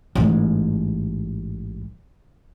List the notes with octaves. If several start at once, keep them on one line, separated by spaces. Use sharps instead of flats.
A1 G#2